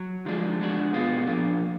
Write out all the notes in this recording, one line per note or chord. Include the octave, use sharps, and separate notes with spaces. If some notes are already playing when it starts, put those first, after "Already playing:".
Already playing: F#3
D3 F3 G#3 D4
G#3 D4 F#4
B2 G#3 B3 F4
A#2 F3 A#3 D4 F4